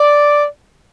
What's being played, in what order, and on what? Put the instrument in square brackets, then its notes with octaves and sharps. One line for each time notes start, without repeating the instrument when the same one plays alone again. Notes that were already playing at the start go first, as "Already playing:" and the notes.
Already playing: [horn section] D5